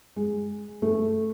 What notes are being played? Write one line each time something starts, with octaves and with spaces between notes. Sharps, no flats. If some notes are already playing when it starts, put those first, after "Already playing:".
G#3
A3